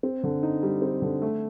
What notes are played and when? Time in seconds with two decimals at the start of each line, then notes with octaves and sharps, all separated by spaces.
0.03 C4
0.24 D3
0.43 D#4
0.63 G3
0.82 C4
1.02 D3
1.22 A3